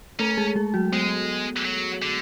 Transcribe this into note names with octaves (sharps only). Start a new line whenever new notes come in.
A3 C#4 A4
G#3 G#4
G#3 G#4
F#3 F#4
G#3 B3
F#3
D3